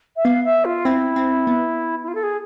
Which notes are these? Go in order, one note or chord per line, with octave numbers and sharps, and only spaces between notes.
E5
B3 F5
E5
F4
C4 E4
C4
B3
E4
F4
A4
G#4